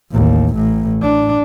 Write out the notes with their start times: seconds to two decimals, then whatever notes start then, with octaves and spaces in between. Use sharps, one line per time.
0.11 A1 D#2
0.54 A1 A2
1.02 D4